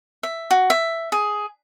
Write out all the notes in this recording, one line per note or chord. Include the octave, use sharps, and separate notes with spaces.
E5
F#4
E5
G#4